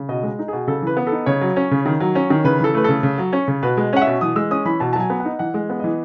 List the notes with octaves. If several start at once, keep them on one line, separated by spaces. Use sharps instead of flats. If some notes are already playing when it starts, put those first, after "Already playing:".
Already playing: C#3
B2 D#5
G#3
D#4
B2 G#4
C#3 A4
E3 B4
B3
A4
D#4
C#3 C#5
F#3
C#4
C#3
D#3
F#3
C#4
D#3
C#3 B4
E3 A4
A3 B4
C#3 A4
C#3
F#3
C#4
C#3
B2 B4
G#3
C#4 F#5
E5
B2
E3 D#6
G#3 E6
C#4 D#6
E3 B5
B2 A5
A5
F#3 G#5
B3
F#5
D#4
E3 F#5
G#3
B3
E3 D#5